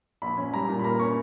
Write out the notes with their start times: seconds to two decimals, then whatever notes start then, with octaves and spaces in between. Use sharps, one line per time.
0.22 A#1 B5
0.37 C#4
0.54 G3 A#5
0.68 A#2
0.79 B5
0.84 A#3 A#5
1.00 C#4 C#6